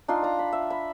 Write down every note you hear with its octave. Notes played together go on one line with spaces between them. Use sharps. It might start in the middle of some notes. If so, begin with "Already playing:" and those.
D4 D#4 F4 C6
D5 A#5
B5
E5
B5